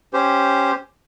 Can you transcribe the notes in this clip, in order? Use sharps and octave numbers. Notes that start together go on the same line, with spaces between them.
C#4 G4 C5